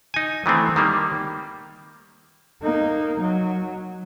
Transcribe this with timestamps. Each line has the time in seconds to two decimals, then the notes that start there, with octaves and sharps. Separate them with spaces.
0.14 D#4 G#5
0.46 D#3 E3 A3 C4
0.76 D#3 G3 A#3
2.62 A#3 D#4
3.20 F#3